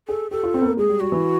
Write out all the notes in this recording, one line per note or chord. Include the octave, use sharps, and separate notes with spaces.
G#4 A4
G4 A4
F4
C4
B3
A#3
G#3 G#4
G3
G3 F#4
E3